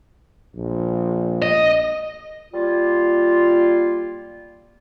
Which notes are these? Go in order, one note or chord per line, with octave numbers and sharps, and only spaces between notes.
A#1
D#5
G3 A#3 F4